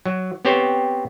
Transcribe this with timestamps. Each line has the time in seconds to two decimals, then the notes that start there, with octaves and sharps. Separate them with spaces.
0.06 F#3
0.45 B3 C4 G4 C5 C#5